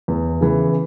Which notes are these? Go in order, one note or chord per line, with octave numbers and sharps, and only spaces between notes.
E2
C#3 E3